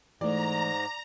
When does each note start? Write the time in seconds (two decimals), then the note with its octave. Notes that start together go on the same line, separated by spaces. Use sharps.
0.21 G#2 E3 A3 D5 A#5